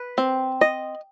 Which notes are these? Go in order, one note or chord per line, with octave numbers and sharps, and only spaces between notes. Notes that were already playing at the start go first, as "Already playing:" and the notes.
Already playing: B4
C4
D#5